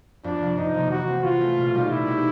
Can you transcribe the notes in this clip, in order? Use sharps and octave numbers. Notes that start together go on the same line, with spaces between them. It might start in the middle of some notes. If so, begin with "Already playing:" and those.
F2 D4
C3 F3 A#3
F2 D#4
C3 F3 A#3
E3 F#4
A3 C4
E3 F4
A3 C4
B2
G3 B3 D#4 G4
B2 E4
G3 B3 D#4 G4